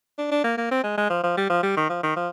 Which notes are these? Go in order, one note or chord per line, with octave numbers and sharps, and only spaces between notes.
D4
D4
A#3
A#3
C4
G#3
G#3
F3
F3
G3
F3
G3
D#3
F3
D#3
F3